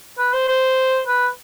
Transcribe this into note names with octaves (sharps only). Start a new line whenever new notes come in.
B4
C5
C5
B4